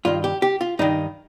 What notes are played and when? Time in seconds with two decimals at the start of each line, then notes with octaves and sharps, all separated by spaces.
0.05 G2 D#3 F4
0.24 G4
0.42 G4
0.61 F4
0.79 G2 D#3 D#4